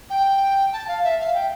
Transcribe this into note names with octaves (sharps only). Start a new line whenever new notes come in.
G5
A5
F5
E5
F5
G5